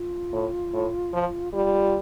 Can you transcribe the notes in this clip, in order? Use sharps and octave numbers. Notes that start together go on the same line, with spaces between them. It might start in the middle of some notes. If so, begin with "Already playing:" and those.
Already playing: F4
A2
A2
F3
G3 F4